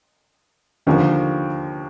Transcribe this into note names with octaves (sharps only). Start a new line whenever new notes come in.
D#2 D3 F3 A#3